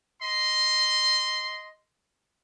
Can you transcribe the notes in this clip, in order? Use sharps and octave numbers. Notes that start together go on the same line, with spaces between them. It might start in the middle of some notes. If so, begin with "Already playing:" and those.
D#5 C6